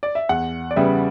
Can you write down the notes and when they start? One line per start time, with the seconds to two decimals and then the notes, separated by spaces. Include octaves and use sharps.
0.03 D5
0.15 E5
0.29 E2 F#5
0.71 D5
0.76 C#3 G3 B3 E5